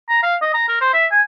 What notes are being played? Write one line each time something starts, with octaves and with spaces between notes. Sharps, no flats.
A#5
F5
D#5
A#5
A#4
C5
E5
G#5